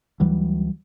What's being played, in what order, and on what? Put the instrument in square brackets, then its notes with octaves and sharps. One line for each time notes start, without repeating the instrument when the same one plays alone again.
[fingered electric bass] D2 E3 F#3 G3